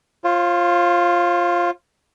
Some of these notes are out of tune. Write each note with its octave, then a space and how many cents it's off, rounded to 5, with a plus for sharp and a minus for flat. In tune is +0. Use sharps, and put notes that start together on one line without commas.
F4 +0 C5 +45